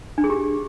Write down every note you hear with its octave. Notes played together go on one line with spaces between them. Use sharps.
D4
G#4
G4